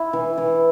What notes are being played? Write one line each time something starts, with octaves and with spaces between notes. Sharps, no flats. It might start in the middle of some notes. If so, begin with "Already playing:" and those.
Already playing: E4
E3
E3